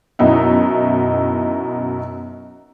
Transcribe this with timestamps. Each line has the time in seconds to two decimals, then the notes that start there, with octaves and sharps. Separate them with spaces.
0.19 F#2 B2 D#4 E4